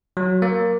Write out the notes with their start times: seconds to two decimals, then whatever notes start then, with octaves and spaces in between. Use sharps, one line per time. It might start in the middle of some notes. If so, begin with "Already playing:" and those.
0.17 F#3
0.42 A#3